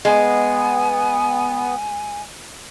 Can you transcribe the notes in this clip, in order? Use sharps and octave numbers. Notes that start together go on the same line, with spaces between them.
G#3 B3 G#5